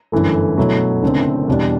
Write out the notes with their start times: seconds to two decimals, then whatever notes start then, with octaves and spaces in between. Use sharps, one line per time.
0.12 G1 F#2 E3 A3
0.58 B2 F#3 A3 E4
1.03 F#1 F#2 D3 A3 C4
1.48 E2 B2 G3 D4